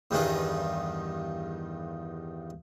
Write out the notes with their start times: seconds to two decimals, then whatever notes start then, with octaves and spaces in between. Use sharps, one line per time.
0.11 E2 G2 D#3 D4 G#4